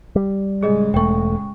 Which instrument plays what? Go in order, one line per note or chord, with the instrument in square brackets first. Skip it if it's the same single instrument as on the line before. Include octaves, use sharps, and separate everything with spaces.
[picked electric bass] G3
[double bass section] A2 C#3 G#3 [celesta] G#4 D#5
[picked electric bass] E1 A3 [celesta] G5 C#6